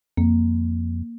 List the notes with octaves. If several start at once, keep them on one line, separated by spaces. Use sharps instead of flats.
F2 A#3